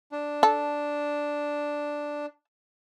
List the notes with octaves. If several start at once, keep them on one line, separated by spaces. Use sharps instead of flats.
D4
A4